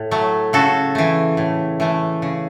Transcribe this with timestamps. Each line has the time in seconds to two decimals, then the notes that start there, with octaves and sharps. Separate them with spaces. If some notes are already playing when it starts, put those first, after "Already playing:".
Already playing: A2
0.11 F#3 A3
0.53 C#3 F#4 A4
0.95 E3 A3
1.37 A2
1.80 E3 A3
2.22 C#3